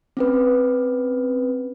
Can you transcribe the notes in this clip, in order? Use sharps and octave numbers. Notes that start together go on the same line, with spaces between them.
C4 C#4 B4